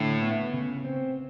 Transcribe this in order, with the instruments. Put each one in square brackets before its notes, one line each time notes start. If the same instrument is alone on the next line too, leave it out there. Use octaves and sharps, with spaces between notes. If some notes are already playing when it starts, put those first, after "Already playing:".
Already playing: [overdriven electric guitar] A2 [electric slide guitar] D3
[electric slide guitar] B3
C#3
C4